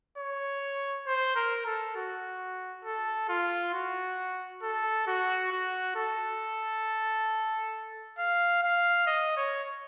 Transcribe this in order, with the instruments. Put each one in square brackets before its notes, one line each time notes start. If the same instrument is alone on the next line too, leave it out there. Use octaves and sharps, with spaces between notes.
[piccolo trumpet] C#5
C5
A#4
A4
F#4
A4
F4
F#4
A4
F#4
F#4
A4
F5
F5
D#5
C#5